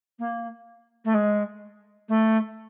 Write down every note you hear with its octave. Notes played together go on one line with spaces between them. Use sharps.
A#3
A3
G#3
A3